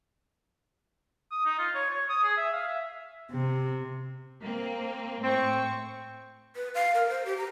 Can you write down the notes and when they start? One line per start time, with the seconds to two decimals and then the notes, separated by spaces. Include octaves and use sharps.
1.31 D#6
1.46 D#4
1.59 F4
1.75 C#5
1.91 C#5
2.10 D#6
2.23 G#4
2.37 E5
2.53 F5
2.68 E5
3.31 C3
4.42 A#3 C4
5.24 A2 C4 C#6
6.56 B4
6.75 F5
6.95 A#4
7.09 C5
7.25 G4
7.37 A#5